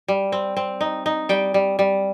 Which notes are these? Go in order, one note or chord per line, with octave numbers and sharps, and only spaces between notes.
G3
C4
C4
D#4
D#4
G3 G5
G3
G3